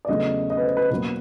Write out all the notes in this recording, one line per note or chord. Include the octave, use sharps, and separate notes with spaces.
D5
E2 C#3 F#3 A3 D#5
D#5
B4
C5
B4
B2 F#3 A#3 B4